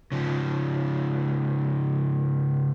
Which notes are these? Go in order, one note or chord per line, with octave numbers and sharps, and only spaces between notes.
C#3 F3